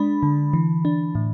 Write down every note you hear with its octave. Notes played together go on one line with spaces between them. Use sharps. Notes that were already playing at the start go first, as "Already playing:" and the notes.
Already playing: G#3 D4 B5
D3
E3
D4
A2